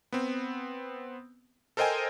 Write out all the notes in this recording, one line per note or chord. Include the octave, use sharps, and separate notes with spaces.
B3 C4
A4 A#4 C5 D#5 G5 G#5